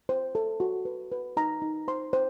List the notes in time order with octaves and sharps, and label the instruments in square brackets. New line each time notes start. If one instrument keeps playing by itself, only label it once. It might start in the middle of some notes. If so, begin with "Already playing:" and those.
[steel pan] C5
A4
F#4
B4
B4
D#4 A#5
D#4
C5 C6
C5